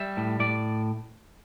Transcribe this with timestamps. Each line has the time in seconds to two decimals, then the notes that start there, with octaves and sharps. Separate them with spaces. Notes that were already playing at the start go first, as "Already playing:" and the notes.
Already playing: G3 E5
0.17 A2
0.40 A2 D5